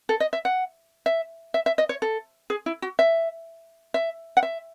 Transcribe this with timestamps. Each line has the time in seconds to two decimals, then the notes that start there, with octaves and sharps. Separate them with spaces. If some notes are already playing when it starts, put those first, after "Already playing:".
0.09 A4
0.20 D#5
0.33 E5
0.45 F#5
1.06 E5
1.54 E5
1.66 E5
1.78 D#5
1.89 C#5
2.02 A4
2.50 G#4
2.66 E4
2.82 F#4
2.99 E5
3.94 E5
4.37 F#5
4.43 E5